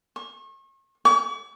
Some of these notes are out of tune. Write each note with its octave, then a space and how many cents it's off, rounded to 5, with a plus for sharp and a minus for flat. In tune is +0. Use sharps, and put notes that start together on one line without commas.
C#6 -40
C#6 +40